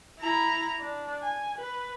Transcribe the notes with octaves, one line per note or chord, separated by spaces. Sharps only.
E4 A#5
D4
G#5
B4